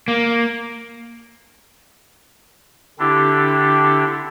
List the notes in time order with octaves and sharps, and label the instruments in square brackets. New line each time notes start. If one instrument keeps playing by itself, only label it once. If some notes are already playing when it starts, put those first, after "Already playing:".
[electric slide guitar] A#3
[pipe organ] D3 C4 D4 E4 G4 A4